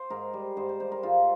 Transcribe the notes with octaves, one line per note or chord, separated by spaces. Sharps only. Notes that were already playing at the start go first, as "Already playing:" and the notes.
Already playing: C5
G#2 A#4
G3
G#2 C5
C5
G3 C5
A#4
G#2 F4